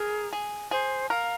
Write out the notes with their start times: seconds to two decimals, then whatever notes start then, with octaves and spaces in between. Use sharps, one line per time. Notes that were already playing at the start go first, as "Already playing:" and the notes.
Already playing: G#4 A#4
0.33 G#4
0.71 G#4 C5
1.10 A#4 F5